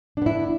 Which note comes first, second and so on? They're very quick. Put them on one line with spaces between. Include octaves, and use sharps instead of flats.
D4 B3 E4